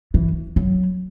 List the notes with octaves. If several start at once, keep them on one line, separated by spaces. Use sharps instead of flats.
E3
F#3